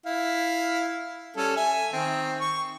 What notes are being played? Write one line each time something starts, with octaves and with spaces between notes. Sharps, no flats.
E4 F5
G3 C#4 A4
E5 G#5
D#3 C4
C#6